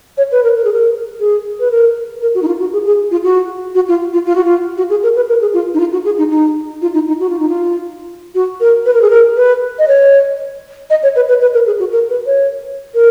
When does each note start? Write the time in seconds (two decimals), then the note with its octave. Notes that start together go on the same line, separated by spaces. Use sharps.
0.17 C#5
0.32 B4
0.43 A#4
0.56 A#4
0.64 G#4
0.73 A#4
1.20 G#4
1.60 B4
1.71 A#4
2.22 A#4
2.35 F#4
2.43 D#4
2.47 F4
2.60 F#4
2.73 G#4
2.85 G#4
3.11 F4
3.24 F#4
3.75 F#4
3.88 F4
4.13 F4
4.26 F4
4.35 F#4
4.44 F4
4.77 F#4
4.90 G#4
5.03 A#4
5.16 B4
5.28 A#4
5.41 G#4
5.54 F4
5.74 D#4
5.80 F4
5.92 F#4
6.05 G#4
6.18 D#4
6.30 D#4
6.82 F4
6.94 D#4
7.07 D#4
7.20 F#4
7.29 F4
7.39 D#4
7.49 F4
8.35 F#4
8.60 A#4
8.86 B4
8.94 A#4
9.02 G#4
9.10 A#4
9.37 B4
9.79 D#5
9.88 C#5
10.90 D#5
11.03 C#5
11.16 B4
11.28 B4
11.41 B4
11.54 A#4
11.66 G#4
11.79 F#4
11.92 A#4
12.10 B4
12.26 C#5
12.94 A#4